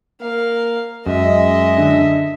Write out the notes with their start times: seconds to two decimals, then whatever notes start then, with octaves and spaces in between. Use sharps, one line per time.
0.21 A#3 F5
1.06 F#2 G#3 D#5 E5
1.77 D3